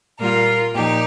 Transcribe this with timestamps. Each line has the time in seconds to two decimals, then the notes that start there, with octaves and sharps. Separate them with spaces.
0.19 A#2 G3 A#3 F4 A#4
0.75 A#2 F3 D#4 G4